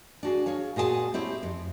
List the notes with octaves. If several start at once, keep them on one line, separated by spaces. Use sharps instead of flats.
D4 F#4 G#4
G#4 C#5 F5
A#2 F#4 G#4 C#5 A5
C4 E4 G4 C#5
F2